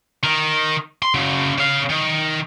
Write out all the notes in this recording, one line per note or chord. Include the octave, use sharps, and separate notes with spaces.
D#3
C6
C#3 F#3
C#3 F5
D#3